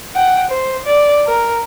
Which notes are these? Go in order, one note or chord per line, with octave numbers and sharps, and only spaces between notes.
F#5 G5
C5
D5
A#4